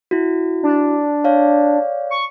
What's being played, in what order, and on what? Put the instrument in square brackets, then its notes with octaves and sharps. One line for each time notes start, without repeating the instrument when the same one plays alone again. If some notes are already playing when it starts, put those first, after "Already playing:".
[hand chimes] E4 F#4
[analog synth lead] D4
[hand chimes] C#5 D5 F5
[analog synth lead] C#6